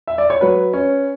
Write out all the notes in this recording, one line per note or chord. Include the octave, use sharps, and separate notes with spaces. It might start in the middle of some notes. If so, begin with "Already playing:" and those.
E5
D5
C#5
F#3 B4
C#4